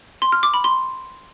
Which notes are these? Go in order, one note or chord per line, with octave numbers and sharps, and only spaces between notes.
C6
F6
D6
B5
C6